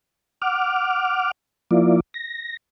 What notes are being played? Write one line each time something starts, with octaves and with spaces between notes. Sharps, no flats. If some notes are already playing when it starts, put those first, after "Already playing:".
F#5 D6 F6
F3 A#3 E4 F4 D5
A#6